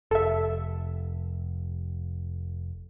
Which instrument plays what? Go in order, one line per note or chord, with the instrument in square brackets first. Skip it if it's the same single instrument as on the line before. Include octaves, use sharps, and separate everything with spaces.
[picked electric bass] F1 [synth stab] A4 E5